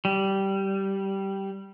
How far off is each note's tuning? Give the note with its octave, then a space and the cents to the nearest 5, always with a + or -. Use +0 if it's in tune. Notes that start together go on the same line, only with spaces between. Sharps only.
G3 -10